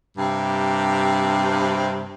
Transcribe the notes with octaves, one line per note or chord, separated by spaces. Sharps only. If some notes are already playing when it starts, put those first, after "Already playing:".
G2 C3